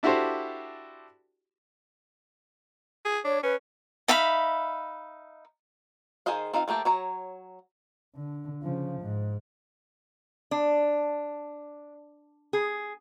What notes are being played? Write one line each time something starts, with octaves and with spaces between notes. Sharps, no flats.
D4 E4 F#4 G4 A4 C5
G#4
D4 C#5
C#4 B4
D#4 E5 F5 B5
D#3 G#4 C5 D#5 F5
C4 D#4 F4 F5
F3 A3 A#3 G4
F#3 C#5 A#5
D3
C#3 F3
G#2
D4
G#4